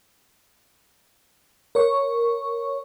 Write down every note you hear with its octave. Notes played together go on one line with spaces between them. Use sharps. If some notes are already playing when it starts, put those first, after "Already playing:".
A#4 C#5 C#6